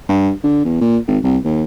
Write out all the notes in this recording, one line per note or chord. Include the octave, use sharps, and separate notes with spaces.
G2
D3
E2
A#2
G#1
C2
D#2